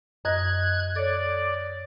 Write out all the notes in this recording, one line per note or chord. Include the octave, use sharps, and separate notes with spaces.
F#2 D#5 F#6 G#6
A4 C#5 D5